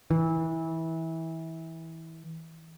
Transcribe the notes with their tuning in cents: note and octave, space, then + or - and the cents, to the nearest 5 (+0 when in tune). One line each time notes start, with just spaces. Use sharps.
E3 -20